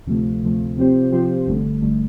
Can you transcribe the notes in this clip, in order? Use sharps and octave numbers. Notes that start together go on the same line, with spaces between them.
D2 C3 F3 A3
D2 C3 F3 A3
C3 F3 C4 G4 C5
C3 F3 C4 G4 C5
G1 G2 D3 A3
G1 G2 D3 A3